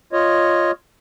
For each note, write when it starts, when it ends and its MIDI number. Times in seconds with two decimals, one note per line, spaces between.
0.13 0.71 65
0.13 0.71 73
0.13 0.71 75